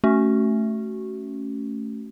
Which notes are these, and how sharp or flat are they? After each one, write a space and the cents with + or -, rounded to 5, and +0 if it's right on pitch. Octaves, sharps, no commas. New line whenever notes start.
A3 +0 C#4 +0 F#4 +25